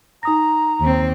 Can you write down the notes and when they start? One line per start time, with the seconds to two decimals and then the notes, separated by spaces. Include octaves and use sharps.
0.23 D#4 A#5 D#6 A#6
0.80 D#2 C4